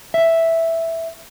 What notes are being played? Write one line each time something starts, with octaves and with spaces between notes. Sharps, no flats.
E5